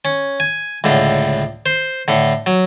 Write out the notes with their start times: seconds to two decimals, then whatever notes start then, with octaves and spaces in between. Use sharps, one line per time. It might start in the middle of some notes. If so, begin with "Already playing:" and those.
0.05 C#4
0.40 G#5
0.84 C#2 A2 D3
1.66 C5
2.08 A2 D3
2.46 F#3